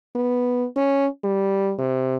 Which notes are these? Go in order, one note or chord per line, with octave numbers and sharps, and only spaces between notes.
B3
C#4
G3
C3